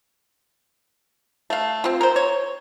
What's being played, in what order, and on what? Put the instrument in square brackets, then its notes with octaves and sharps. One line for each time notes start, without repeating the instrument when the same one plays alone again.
[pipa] A3 F5
C4 F4
A#4 C5
C#5